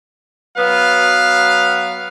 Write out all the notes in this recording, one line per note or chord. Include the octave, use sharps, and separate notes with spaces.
F#3 B3 B4 F5